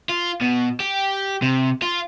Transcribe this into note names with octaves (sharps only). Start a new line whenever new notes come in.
F4
B2
G4
C3
F4